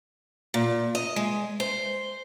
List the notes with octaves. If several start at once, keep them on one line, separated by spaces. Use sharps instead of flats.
A#2
D#5
G#3
C5